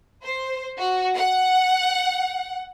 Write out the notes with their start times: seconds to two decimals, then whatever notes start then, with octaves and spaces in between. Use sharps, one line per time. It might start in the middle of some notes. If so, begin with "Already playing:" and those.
0.23 C5
0.78 F#4
1.15 F#5